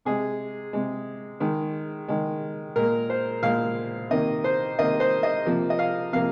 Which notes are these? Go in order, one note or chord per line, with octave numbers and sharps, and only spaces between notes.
C3 G#3 G#4
C3 G#3
D#3 G#3
D#3 G#3
A#2 G#3 A#4
C5
A#2 G#3 F5
C3 D#3 A#3 D#5
C5
C3 D#3 A#3 D#5
C5
D#5
C3 F3 A#3
D#5
F5
C3 F3 A#3 F5